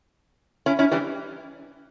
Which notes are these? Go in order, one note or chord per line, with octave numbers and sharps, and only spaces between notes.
C#4 E4
C#4 E4
E3 G3